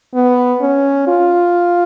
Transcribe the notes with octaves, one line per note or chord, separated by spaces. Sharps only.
B3
C#4
F4